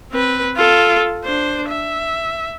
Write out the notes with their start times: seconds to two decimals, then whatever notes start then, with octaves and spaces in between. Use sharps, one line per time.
0.12 C4 B4
0.56 F4 A4
1.24 D4 C5
1.69 E5